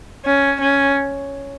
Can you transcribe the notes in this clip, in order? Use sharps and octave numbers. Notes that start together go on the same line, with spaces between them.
C#4
C#4